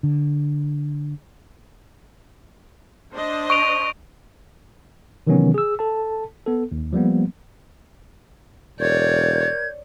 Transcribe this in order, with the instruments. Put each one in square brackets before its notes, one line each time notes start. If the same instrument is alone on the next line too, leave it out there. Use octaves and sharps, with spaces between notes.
[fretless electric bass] D3
[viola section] D4 C5 D#5
[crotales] C#6 D7 F7
[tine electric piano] C3 D#3 E3 F#3 B3 C#4
G#4 E6
A4 A5
B3 A4
D#2
F3 G3 A#3 B3
[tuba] E1 [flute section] A#4 G6 G#6 [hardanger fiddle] C#5 D5